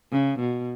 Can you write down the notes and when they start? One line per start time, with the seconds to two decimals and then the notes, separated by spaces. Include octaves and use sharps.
0.11 C#3
0.39 B2